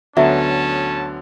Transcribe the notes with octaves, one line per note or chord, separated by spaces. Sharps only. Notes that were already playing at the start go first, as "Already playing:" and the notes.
D2 D3 F#3 B3 C#4 E5 A5